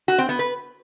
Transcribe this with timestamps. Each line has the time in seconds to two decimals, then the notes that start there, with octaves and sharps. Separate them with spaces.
0.08 F#4
0.18 C4
0.29 B3
0.39 B4